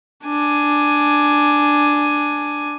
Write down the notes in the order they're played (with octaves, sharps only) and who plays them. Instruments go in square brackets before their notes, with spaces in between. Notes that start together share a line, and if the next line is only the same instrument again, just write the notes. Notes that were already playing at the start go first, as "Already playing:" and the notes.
[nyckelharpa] D4 G#5